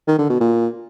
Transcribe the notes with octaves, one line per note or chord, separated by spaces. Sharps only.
D#3
D3
B2
A#2